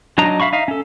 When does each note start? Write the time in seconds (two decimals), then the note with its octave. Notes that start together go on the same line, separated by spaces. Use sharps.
0.18 F#3 D4 D#4 D#5 A#5
0.40 E5 F5 B5 C#6
0.53 D#4 E5 F5
0.68 C#4 A4